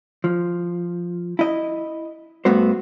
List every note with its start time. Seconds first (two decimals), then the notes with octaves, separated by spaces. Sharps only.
0.24 F3
1.39 E4 D#5
2.45 G2 A3 B3 F#4 C5